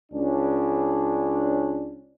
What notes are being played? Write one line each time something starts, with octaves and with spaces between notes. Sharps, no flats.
C#2 C#4 D4